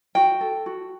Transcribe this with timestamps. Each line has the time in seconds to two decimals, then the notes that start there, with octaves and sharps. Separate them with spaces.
0.15 F#4 G5
0.41 A4
0.66 F#4